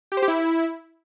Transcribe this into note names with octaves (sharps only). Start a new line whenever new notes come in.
G4
C5
G4
E4